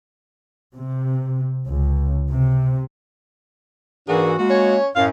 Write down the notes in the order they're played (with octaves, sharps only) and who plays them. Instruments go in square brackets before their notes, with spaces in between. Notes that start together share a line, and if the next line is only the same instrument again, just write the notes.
[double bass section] C3
C#2
C3
[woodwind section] G#2 E3 F#4 [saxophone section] A#3 D4 G#4
[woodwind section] G#3 A#3 F#4
[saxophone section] C#4 C#5
[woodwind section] F#2 A2 [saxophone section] F5